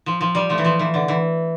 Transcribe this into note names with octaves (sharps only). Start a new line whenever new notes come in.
F3
F3
G3
F3 A3
E3
F3
E3
D3
E3